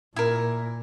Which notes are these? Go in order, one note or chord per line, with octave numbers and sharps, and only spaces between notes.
A#2 E4 A#4